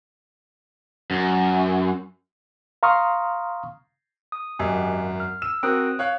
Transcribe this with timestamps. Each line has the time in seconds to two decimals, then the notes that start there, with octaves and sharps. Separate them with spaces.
1.11 F#2
2.83 F5 A#5 C6 C#6 D#6 F6
4.32 D#6
4.59 G#1 F#2 G4 D#5 G#5
5.20 F6
5.42 E6 E7
5.63 C4 F#4 A#4 D#6 F#6 D7
5.99 C#5 F5 F#6